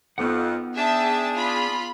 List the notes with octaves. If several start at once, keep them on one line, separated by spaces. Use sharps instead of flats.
F2 B3 D#4 F#5
D4 G#4 E5 G5 A5
F4 B5